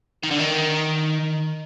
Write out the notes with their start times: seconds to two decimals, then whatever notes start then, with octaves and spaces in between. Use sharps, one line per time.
0.23 D#3
0.31 D3
0.39 D#3